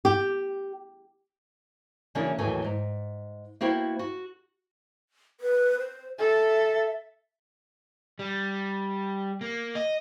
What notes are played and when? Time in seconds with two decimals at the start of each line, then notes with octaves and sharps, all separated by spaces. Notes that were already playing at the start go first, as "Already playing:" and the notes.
0.05 G4
2.15 C#3 E3 F#3 A#3 C#4 D4
2.38 D#2 A2 E3 F#3 A3 G#5
2.64 G#2
3.61 A#3 B3 E4 F#4 C5 G5
3.99 F#4
5.40 B4
5.79 C5
6.18 A4 E5
8.19 G3
9.41 A#3
9.75 D#5